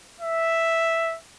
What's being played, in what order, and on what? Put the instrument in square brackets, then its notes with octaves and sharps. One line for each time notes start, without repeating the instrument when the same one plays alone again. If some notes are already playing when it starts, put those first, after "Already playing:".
[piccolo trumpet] E5